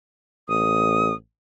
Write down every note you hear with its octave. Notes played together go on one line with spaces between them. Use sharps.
A1 D#6